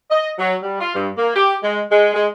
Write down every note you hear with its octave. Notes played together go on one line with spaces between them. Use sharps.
D#5
F#3
G3
F4
G2
A#3
G4
G#3
G#3
G#3